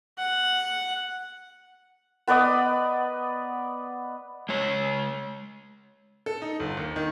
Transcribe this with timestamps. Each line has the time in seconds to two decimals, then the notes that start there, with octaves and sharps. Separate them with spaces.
0.18 F#5
2.27 B3 B4 D5 D#5
4.49 G#3 C#5
6.26 A4
6.42 D#4
6.60 G1
6.77 D#2
6.96 D#3